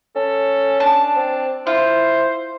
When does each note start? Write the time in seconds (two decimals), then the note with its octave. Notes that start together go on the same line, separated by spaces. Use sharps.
0.16 C#4 A4
0.80 D4 A5
1.16 C4
1.67 E4 F4 C5